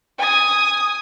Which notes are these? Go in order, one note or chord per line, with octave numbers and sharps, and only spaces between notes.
G#5 D#6